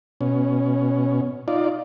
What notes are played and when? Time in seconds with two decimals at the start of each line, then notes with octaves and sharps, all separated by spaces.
0.21 B2 C#4
1.48 D#4 F4 D5